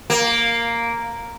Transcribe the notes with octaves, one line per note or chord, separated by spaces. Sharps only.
A#3